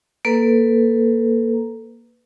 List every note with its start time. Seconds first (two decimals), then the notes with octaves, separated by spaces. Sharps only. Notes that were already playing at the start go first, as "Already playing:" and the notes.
0.25 A#3 A4 B4